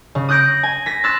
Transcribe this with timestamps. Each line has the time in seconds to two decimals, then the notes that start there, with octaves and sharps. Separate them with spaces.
0.15 C#3
0.29 D#6 F#6 G6 A#6 D7
0.63 G#5
0.86 A#6 B6
1.04 C6 E6 F#6 A6